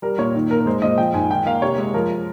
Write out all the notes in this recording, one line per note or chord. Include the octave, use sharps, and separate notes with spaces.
G3 A#4
A#2 C#5
D#3
A#3 A#4
A#4
G#3 C5
A#2 D#5
F3 G5
G#2 G#5
D#3 G5
A#3 F5
C3 C#5
G#3
F3 A#4